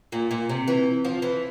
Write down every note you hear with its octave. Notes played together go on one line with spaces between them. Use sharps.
A#2
A#2
C3
E3
F3
E3